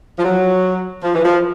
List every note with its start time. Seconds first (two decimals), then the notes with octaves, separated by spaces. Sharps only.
0.17 F3
0.23 F#3
1.02 F3
1.13 E3
1.23 F3